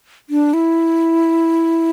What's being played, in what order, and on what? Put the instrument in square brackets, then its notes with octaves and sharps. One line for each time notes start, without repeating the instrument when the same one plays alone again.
[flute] D4
E4